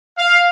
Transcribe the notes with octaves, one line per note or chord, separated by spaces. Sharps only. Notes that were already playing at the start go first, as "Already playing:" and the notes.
F5